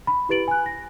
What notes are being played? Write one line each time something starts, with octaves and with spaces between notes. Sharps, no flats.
B5
E4 G4 B4 A6 D7 F#7
G#5 F#6
A#6